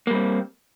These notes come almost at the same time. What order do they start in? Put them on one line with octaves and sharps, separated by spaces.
A#3 G3 C4